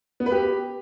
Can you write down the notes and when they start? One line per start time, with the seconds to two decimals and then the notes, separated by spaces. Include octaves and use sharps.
0.20 B3
0.26 B4
0.32 G4